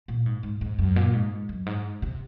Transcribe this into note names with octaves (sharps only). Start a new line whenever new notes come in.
A#2
G#2
G#2
G#2
F#2
A#2
G#2
F#2
G#2
C3